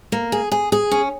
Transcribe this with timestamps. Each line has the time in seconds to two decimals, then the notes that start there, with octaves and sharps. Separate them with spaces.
0.12 A#3
0.32 G#4
0.52 G#4
0.72 G#4
0.91 C#4